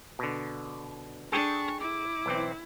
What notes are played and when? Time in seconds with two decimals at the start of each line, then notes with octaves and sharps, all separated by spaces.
0.19 B2 D3
1.32 D4 G#4 A4 G5 C#6
1.80 E4 D6
2.26 B1 E3 C4